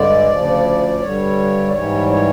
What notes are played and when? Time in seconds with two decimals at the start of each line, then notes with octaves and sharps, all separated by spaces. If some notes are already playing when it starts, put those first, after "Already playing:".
Already playing: G2 D3 G#3 D5
0.28 D2 C#3 F3
1.00 G2 D3 G3 C#5
1.68 D5
1.72 G#2 E3 G3 C#5
2.09 C#5